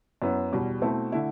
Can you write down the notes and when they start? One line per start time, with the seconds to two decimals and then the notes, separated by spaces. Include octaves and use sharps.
0.22 F#2 F#3 B3 E4
0.52 E2 B2 G3
0.81 B2 A3 C4 E4
1.12 D3 A3 E4